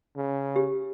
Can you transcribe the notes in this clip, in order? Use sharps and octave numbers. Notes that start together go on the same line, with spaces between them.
C#3
G4